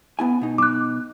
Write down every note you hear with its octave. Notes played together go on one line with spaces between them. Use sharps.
B3 E4 G#5
B2 D#4
D6 F#6